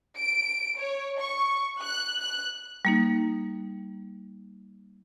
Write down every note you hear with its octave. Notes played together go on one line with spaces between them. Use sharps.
D7
C#5
C#6
F#6
F#6
G3 A#3 D#4